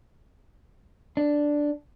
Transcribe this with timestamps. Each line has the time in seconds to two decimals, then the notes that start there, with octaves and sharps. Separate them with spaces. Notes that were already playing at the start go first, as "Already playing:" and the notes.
1.17 D4